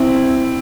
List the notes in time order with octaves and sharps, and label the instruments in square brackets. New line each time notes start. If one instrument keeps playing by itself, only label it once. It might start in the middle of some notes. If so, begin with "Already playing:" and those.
Already playing: [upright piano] C4 E4